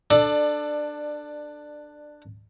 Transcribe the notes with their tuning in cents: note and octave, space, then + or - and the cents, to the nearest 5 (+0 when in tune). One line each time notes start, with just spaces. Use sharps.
D4 +15 A4 +0 D5 +25